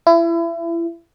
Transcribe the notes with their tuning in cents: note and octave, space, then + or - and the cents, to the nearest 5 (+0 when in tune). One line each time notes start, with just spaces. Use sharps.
E4 +30